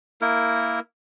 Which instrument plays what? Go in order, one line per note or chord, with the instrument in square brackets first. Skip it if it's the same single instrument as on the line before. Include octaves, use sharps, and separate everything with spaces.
[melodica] A#3 E4 A#4